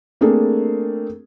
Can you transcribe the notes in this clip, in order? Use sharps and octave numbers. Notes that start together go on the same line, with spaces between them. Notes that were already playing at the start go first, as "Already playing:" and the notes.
A3 A#3 C4 D4 G#4 A4